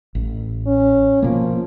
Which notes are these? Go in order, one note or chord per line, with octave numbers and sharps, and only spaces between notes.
A1
C#4
B2 F3 A#3